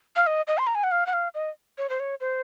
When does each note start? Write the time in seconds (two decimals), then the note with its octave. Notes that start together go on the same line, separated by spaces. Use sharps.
0.16 F5
0.27 D#5
0.47 D#5
0.58 C6
0.67 A#5
0.75 G#5
0.84 F#5
0.91 F5
1.07 F#5
1.13 F5
1.35 D#5
1.78 C#5
1.90 C5
2.00 C#5
2.21 C5